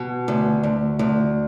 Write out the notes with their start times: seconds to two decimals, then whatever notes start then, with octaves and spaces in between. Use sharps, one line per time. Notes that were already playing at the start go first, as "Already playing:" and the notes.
Already playing: B2
0.28 D2
0.63 D2
0.99 D2